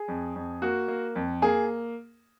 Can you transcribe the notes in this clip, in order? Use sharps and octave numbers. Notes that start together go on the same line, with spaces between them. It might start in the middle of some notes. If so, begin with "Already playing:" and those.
Already playing: G#4
F2
F2
A#3 F#4
A#3
F2
A#3 G#4